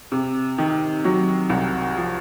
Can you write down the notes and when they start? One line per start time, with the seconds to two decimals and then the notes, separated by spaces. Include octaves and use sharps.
0.12 C3
0.58 D#3
1.04 F#3
1.50 C2
1.97 F3